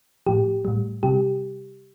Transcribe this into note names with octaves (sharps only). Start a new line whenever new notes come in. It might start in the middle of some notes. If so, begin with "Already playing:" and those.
A2 F3 G4
A2 G3
C3 G3 G4